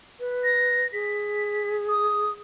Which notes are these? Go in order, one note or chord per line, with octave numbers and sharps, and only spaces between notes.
B4
A#6
G#4 B6
D#6